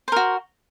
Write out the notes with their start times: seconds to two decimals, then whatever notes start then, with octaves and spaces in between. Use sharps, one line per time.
0.08 C5
0.12 A#4
0.16 F#4